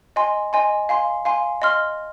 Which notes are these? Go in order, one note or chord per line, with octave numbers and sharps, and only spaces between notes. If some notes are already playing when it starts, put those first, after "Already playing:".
D#5 G#5 C6
D#5 G#5 C6
F5 G#5 C6
F5 G#5 C6
D#5 C6 F6